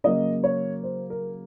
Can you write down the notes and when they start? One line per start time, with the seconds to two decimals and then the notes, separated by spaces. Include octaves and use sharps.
0.04 C#3 F#3 A#3 D#5
0.44 C#5
0.83 C5
1.10 A#4